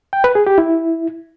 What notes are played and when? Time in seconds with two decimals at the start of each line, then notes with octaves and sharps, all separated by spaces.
0.13 G5
0.24 B4
0.35 G#4
0.47 G4
0.58 E4